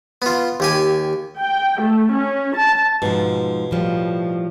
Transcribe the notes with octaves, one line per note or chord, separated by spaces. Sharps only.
B3 F4
D#2 G4 G#5
G5
A3
C#4
A5
G#2 B2 F3
A2 F3 G3